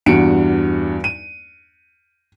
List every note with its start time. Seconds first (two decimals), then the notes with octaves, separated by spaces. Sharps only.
0.06 E2 G2 D4 F#4 C#7 D7
1.04 D#7